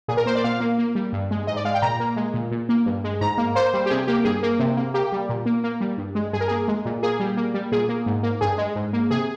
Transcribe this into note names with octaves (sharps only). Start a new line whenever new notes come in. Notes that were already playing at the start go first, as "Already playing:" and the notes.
A#2 G#4
A#4
A#3 C5
D5
A#2 F5
A#3
A#3
G3
G2
G#3
G#2 D#5
D5
G#3 F5
G5
A#2 A#5
A#3
G#3
A#2
A#2
A#3
G2
G#3
G#2 A#5
A#3
A#3 C5
G3
G4
C3 G#4
A#3 G4
G2 G#4
A#3
C3
A#3
A#3 G4
G3
A#2
A#3
A#3
G3
G2
G#3
G2 G#4
A#4
A#3 G#4
G#3
A#2
A#3 G#4
G3
A#3
G3
A#2 G#4
A#3
G#2
A#3
G2 G#4
G#3
G#2
A#3
C3 G#4